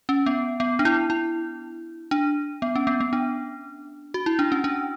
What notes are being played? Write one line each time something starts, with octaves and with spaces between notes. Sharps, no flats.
C#4
B3
B3
D4
E4
E4
D4
B3
C#4
B3
B3
D4
F#4
E4
D4
C#4
D4